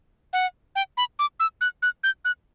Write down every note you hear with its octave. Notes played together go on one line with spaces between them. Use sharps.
F#5
G5
B5
D6
E6
F#6
F#6
G6
F#6